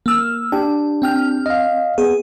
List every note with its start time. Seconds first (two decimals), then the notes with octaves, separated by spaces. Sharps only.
0.06 A#3 E6 F6
0.52 D4 G4 G5
1.02 C4 G5 F6
1.46 D#5 F5
1.98 B3 G#4